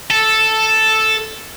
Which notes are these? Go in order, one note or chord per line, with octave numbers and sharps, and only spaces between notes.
A4